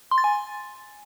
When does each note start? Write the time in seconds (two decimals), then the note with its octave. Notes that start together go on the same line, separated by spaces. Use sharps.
0.11 C6
0.18 A6
0.24 G#5